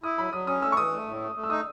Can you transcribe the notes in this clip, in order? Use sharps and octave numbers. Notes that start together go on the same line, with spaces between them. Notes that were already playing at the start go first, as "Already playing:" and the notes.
E4 D#6
F#3 B5
F#3 D#6
C#4 D#6
A3 E6
C#6
E3 D#6
A3
A2
A3
A3
E6
D#4 D#6